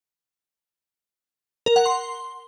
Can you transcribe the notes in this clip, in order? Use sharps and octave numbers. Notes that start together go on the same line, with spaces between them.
A#4
F#5
C6